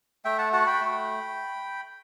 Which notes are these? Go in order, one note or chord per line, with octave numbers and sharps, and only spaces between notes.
A3 E5 G5
F#5 A5
F#4 F#5 A5
G5 B5
A3